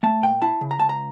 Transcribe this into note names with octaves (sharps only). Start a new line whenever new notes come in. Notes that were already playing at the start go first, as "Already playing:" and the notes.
A3 A5
A#2 G5
E4 A5
C#3
A#5
C#2 A5
A#5